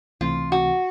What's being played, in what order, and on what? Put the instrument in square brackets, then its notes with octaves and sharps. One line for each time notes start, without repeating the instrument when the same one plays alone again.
[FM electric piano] C#2 C3 E3 A3 C4 [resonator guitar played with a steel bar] F4
[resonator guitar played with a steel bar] F#4